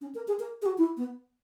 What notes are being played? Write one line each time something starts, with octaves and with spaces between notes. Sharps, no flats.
C#4
A#4
G#4
A#4
G#4
F#4
E4
B3